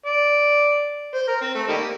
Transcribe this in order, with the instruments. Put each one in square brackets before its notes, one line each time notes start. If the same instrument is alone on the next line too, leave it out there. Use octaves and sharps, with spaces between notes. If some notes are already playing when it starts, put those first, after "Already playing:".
[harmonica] D5
C5
A#4
C4
A3
D#3 G3 A#3